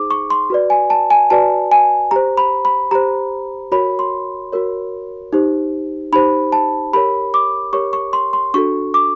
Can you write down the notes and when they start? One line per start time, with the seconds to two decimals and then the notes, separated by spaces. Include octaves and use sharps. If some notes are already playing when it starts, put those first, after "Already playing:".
Already playing: D#4 G#4 C5 D6
0.11 C#6
0.30 C6
0.50 F#4 B4 D5
0.70 G#5
0.90 A5
1.10 G#5
1.30 F#4 B4 D5 A5
1.72 G#5
2.11 G4 C5 A#5
2.37 B5
2.65 B5
2.91 G4 C5 A#5
3.72 F#4 A#4 C#5 B5
3.99 C6
4.52 F#4 A#4 C#5
5.33 D#4 G4 C5
6.12 D#4 G4 C5 B5
6.52 A5
6.93 G4 A#4 C#5 B5
7.34 D6
7.73 G4 A#4 C#5 C#6
7.93 C#6
8.13 C6
8.33 C6
8.54 D4 F#4 A4 C#6
8.94 D6